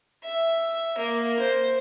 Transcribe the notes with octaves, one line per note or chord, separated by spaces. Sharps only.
E5
A#3
C5